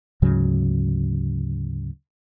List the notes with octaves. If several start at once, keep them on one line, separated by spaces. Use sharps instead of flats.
D2 G#2 C#3 F#3